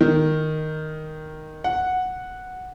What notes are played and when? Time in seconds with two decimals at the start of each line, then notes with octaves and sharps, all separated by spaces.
0.01 D#3
1.64 F#5